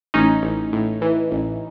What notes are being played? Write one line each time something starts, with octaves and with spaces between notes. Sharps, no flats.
A1 C#4 D#4
A1
A2
E3
A1